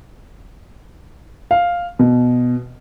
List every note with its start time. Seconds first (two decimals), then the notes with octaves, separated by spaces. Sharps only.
1.51 F5
1.99 B2